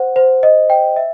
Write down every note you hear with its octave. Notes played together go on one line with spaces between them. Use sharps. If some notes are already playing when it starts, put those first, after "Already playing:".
Already playing: C5 F#5
C5
D#5
G5
E5